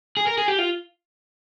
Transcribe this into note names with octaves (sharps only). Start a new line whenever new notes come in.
G#4
A#4
G#4
G4
F4